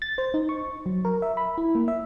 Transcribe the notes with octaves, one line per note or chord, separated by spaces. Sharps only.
A6
C5
D#4
C#6
F#3
A#4
E5
B5
E4
A#3
E5